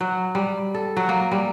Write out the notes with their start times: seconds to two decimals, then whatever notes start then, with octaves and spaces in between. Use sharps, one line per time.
0.01 F#3
0.35 G3
0.74 A4
0.97 F#3
1.09 A#3
1.32 G3